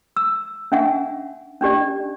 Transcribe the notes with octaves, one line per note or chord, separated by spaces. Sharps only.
E6
C#4 D4 E5 F#5 G#5
C#4 D4 G4 D5